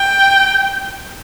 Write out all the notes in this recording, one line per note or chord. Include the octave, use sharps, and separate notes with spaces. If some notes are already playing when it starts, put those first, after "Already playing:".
Already playing: G5